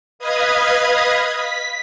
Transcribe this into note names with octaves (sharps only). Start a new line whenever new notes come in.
B4 D#5 F5 B5 D#6 G#6
B6